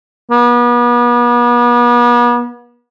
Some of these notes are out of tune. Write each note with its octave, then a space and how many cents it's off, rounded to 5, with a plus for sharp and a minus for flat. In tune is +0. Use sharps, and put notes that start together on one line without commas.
B3 -40